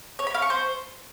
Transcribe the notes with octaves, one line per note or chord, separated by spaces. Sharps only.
C#5
B5
F5
C#6
C5